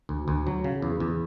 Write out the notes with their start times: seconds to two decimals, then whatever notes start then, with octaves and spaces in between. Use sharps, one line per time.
0.09 D2
0.28 D2
0.47 F#3
0.64 C#3
0.82 E2
1.00 E2